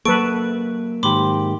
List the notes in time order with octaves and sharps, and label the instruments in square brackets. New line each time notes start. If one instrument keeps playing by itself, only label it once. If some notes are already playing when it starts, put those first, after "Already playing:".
[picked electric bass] F#3 A#3 [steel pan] A4 B4 [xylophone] C#6 D7
[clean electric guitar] G#2 D#3 G4 [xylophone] B5 C6 D6